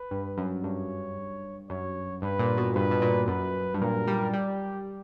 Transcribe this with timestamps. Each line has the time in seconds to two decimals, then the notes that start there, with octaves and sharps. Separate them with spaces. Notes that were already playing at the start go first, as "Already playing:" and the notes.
Already playing: B4
0.11 G2
0.38 F#2
0.63 G2 C#5
1.69 F#2 C#5
2.22 G2 B4
2.39 A#2
2.57 B2
2.75 G2 B4
2.91 B2
3.02 A#2
3.28 F#2 B4
3.74 G2
3.81 A#2 A#4
4.08 G3
4.33 G3 G4